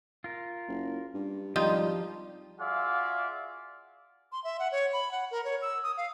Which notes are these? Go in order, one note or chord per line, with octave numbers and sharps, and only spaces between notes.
F4 A#4
F#1
G2
G#1 D#3 F3 G3 D#4 F4
F4 F#4 G#4 D5 E5 F5
C6
E5
F#5
C#5
B5
F#5
A#4
C#5
E6
D#6
F5